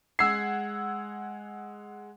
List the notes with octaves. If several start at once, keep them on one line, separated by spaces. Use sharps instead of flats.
G#3 F#5 E6 G#6 C7